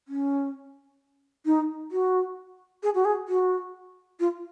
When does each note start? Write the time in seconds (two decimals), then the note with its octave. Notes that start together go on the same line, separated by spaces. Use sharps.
0.08 C#4
1.46 D#4
1.91 F#4
2.83 G#4
2.95 F#4
3.05 G#4
3.28 F#4
4.20 F4